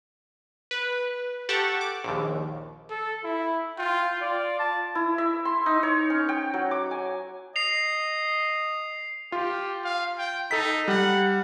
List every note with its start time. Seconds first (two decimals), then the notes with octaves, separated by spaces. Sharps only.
0.71 B4
1.49 G4 A4 F#5 A5 C#6
1.81 D6
2.04 A#1 D#2
2.90 A4
3.24 E4
3.78 F4 G5
4.22 F4 D5
4.59 A5
4.95 E4
5.18 E5
5.45 C6
5.66 D#4
5.83 C#5
6.10 C#4
6.29 G5
6.54 F#3
6.71 D6
6.91 G#5
7.56 D#5 C7 F7
9.32 F4 G4
9.84 F5
10.18 G5
10.51 D#4 A4 B6
10.88 G3 F#5